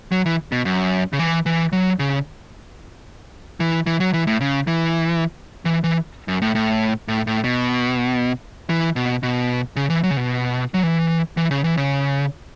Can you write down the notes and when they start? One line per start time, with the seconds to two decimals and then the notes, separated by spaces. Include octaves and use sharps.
0.12 F#3
0.26 E3
0.52 B2
0.65 F#2
1.13 C#3
1.19 E3
1.46 E3
1.72 F#3
1.99 C#3
3.60 E3
3.86 E3
4.00 F#3
4.13 E3
4.27 A2
4.41 C#3
4.67 E3
5.65 E3
5.84 E3
6.28 F#2
6.42 A2
6.55 A2
7.08 A2
7.27 A2
7.44 B2
8.70 E3
8.96 B2
9.23 B2
9.76 C#3
9.90 E3
10.03 F#3
10.10 C#3
10.17 B2
10.74 F#3
10.83 E3
11.37 E3
11.51 C#3
11.64 E3
11.77 C#3